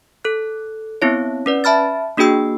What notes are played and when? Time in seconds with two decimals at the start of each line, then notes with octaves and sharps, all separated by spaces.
0.25 A4 F#6
1.02 B3 C4 E4 C#5
1.46 C#4 B4 D5
1.64 E5 A5 B5 F6 A6
2.17 A#3 D4 F#4 G#4 G5 E6